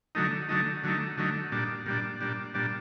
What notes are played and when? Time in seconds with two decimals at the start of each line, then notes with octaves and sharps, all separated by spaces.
0.15 D3 F#3 A3 D#4
0.49 D3 F#3 A3 D#4
0.84 D3 F#3 A3 D#4
1.18 D3 F#3 A3 D#4
1.52 A#2 G3 D4
1.86 A#2 G3 D4
2.21 A#2 G3 D4
2.54 A#2 G3 D4